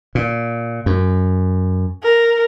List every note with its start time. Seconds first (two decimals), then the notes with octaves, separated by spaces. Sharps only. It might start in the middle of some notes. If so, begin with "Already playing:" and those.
0.15 A#2
0.86 F#2
2.03 A#4